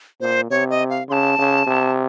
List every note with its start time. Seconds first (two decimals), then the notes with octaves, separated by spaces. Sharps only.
0.21 A#2 C5
0.50 C3 C#5
0.70 D#5
0.90 F5
1.09 C#3 C6
1.12 A5
1.39 C#3
1.67 C3